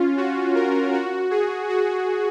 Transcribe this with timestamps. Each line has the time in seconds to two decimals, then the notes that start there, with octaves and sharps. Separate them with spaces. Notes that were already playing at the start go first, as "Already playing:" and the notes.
Already playing: C#4 F4
0.17 F#4
0.55 A#4
0.93 F#4
1.31 G#4
1.69 F#4